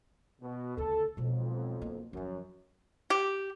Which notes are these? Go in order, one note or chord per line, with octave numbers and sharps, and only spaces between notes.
B2
D2 C#3 A4
B1 F2 B2 G#3
A#3
F#2 D#3 F3
G4